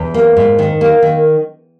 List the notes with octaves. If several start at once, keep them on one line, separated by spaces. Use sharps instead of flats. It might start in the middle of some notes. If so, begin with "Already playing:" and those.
Already playing: E2
A#3
G#2
D#3
A#3
D#3